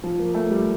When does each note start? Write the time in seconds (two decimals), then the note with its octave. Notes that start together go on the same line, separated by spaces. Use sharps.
0.03 F3
0.19 A#3
0.34 A3
0.51 G3